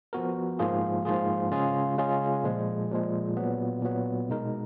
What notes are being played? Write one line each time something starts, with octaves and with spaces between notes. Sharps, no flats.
F3 B3 F#4 A#4
G#2 F3 A#3 F4 G#4
G#2 F3 A#3 F4 G#4
C#3 G#3 C#4 F4 G#4
C#3 G#3 C#4 F4 G#4
A#2 F3 G#3
A#2 F3 G#3
A#2 F#3 B3
A#2 F#3 B3
B2 G#3 D#4 A#4